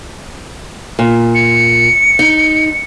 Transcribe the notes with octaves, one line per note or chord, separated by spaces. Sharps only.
A#2
C#7
D#4